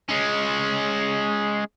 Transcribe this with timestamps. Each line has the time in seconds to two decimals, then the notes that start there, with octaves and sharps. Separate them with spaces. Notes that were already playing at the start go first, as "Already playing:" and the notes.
0.09 G#3 C#4